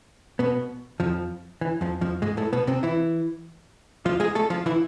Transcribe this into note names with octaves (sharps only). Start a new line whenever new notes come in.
B2 B3
F2 F3
E3
F2 F3
F2 F3
G#2 G#3
A2 A3
B2 B3
C3 C4
E3 E4
F3 F4
G#3 G#4
A3 A4
F3 F4
E3 E4